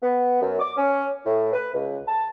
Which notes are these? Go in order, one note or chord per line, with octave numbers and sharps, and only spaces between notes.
B3
F#2
D6
C#4
A2
B4
C#2
A5